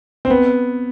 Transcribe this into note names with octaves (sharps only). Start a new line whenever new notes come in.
C4
B3